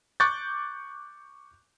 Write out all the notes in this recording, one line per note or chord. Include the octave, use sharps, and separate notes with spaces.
C#6 D6 F#6 G6 A6